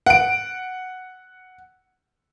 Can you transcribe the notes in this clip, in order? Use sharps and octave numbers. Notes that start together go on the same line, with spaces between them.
F#5 D7